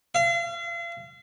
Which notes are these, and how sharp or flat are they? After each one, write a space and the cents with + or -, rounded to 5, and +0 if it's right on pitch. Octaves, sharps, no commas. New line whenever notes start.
F5 -40